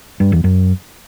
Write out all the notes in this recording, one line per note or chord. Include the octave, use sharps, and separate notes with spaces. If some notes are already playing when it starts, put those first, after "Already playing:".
G2
E2
F#2